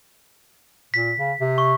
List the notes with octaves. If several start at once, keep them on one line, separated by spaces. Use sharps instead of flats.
A#2 B6
C#3
C3
C#6